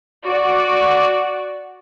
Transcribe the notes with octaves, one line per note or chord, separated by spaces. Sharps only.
F#4 D5